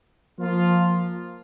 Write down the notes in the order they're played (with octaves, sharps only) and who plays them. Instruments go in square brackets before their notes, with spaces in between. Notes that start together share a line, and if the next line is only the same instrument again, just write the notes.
[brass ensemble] F3 A#3 F4